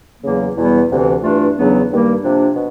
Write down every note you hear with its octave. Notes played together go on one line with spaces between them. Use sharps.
E2 C#3 F#3 A#3
E2 B2 G3 B3 E4
D2 C3 E3
G2 E3 A3 D4 F4
E2 C#3 F#3 B3 D4
G2 D#3 G3 A#3
C3 F3 A#3 D4
B2